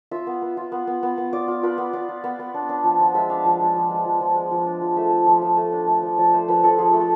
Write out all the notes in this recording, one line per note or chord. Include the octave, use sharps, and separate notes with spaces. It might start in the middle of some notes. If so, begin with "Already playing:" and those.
F4 E5
B3
B3
F4
B3
B3
B3
B3
F4 D5
F4
F4 B4
B3
F4 D5
F4
B3
B3
D4
D4
F3
F3
G#3 E5
D4 F5
F3
G#3 E5
F3
G#3
F3
F3
G#3
F3
D4
F3
A3 E5
A3
F3
F3
A3
D4
A3
F3
F3 D5
A3 C5
F3 B4
F3 A4
F3 G#4
A3
A4